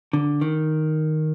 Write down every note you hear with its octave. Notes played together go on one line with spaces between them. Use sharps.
D3
D#3